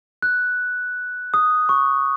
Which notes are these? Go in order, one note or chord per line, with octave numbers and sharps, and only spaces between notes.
F#6
D#6
C#6